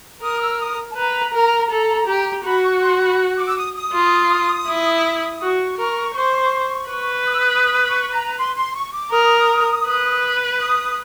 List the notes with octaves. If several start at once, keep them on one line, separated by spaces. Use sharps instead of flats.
A#4 D#6
E6
D#6
A5
B4 A#5
A#4
A4
G4
F#4 B5
C#6
C6
B5
D6
E6
D#6
D#6
F4
E4
F#4 C#6
A#4
C5
B4 C#6
D#6
E6
D#6
D#6
C#6
A#5
C6
C6
C#6
D6
A#4 D#6
B4
D#6